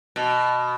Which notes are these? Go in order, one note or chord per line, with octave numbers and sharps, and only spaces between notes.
B2